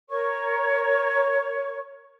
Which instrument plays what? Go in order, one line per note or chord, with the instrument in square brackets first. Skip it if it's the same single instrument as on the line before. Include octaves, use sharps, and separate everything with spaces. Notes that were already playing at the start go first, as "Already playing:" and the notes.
[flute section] A#4 C#5 C#6